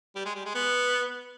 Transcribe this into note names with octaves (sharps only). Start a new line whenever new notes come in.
G3
G#3
G3
G#3
B3